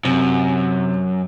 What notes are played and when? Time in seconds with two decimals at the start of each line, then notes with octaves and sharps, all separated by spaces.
0.05 F#2 C3